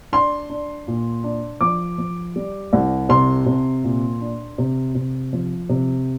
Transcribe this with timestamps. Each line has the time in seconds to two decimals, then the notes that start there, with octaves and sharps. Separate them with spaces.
0.12 D4 C6
0.50 D4
0.87 A#2
1.24 D4
1.61 F3 D6
1.98 F3
2.36 G3
2.73 C2
3.09 C3 C6
3.46 C3
3.84 A#2
4.21 D4
4.58 C3
4.95 C3
5.33 F3
5.69 C3